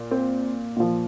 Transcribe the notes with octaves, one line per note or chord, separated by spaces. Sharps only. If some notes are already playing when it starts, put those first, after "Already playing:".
Already playing: A#2
C4
A#2 F3